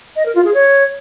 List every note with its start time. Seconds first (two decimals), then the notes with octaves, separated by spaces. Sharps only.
0.16 D#5
0.26 A#4
0.35 F4
0.45 G#4
0.54 C#5